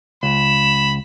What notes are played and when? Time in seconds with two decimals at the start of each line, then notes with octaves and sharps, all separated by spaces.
0.23 C#2 B5 E7